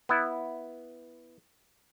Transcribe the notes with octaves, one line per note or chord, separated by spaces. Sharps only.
B3 E4